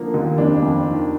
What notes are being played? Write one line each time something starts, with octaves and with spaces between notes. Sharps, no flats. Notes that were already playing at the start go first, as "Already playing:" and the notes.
Already playing: D3 F3 A#3
D#2
F2 D4
F2
D#3